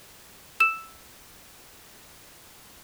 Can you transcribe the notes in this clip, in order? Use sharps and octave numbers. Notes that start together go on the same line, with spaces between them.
E6 E7